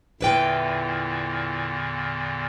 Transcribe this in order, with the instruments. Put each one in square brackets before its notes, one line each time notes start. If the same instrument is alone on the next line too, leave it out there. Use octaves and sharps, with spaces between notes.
[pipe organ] E2 A#2 D3 [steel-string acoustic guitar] E4 B4 G5